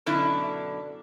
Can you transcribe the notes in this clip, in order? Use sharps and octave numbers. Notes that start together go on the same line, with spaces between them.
F#2 B2 D3 D4 E4